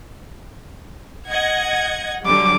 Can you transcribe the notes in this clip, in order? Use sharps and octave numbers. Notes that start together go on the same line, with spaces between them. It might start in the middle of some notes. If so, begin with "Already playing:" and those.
D#5 F#5 G#6
D3 F#3 G3 D6